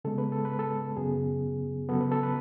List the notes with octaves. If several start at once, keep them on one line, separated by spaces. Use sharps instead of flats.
C#3 G#3 B3 A4
B4
A4
B4
A4
F#2 C#3 F#3 B3 G#4
C#3 F#3 B3 A4
B4
A4
B4